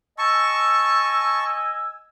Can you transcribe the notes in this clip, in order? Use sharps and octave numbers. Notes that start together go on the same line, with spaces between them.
D#5 G#5 A5 C#6 E6